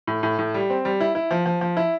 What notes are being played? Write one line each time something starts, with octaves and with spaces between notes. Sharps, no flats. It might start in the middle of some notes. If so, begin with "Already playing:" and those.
A2
A2
A2
G3
C4
G3
E4
E4
F3
F3
F3
E4